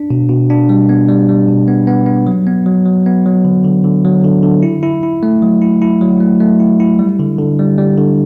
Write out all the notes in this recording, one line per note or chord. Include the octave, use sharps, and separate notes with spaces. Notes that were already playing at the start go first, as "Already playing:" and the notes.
Already playing: D4
B2
B2
D4
G3
B3
G3
G3
B2
B3
B3
B3
F#3
B3
F#3
F#3
B3
F#3
D3
D3
D3
F#3
D3
D3
E4
E4
E4
A3
F#3
E4
E4
F#3
A3
A3
E4
E4
G3
D3
D3
G3
G3
D3